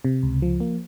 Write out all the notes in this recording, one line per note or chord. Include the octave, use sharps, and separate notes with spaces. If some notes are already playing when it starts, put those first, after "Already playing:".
C3
C#2
F3
A#3